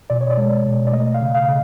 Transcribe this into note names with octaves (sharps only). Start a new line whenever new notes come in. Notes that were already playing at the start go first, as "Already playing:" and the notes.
B2 D5
C#5
D5
G#3
B2
D5
A3 D#5
F5
C#3
F5
C#3